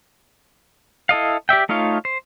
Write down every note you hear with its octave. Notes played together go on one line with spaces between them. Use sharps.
E4 A4 D#5 F5
G4 D5 E5 G5
A3 D#4 F4 C#5 F5
C5